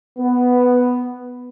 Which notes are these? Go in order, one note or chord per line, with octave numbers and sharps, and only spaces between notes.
B3